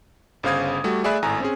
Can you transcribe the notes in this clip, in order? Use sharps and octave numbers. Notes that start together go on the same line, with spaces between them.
G1 C#3 C5 F5 D#6 G#6
G3 A3 F#4
A3 G#4 D5 E5 B5 F#6
G#1 A2 G#5 A#5
C4 C#4 G#4